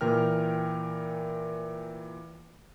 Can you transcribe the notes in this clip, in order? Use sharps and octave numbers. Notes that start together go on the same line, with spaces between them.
A#2 E3 A#4 G5 F6